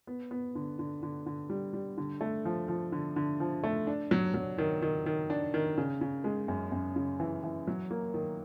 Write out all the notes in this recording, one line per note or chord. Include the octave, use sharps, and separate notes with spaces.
B3
B3
D3
D3
D3
D3
G3
G3
D3
A3
F3
F3
D3
D3
F3
A3
D4
F#3
F#3
D#3
D#3
D#3
D4
D#3
C#3
C#3
G#3
F#2
F#2
C#3
E3
E3
F#3
A#3
D#3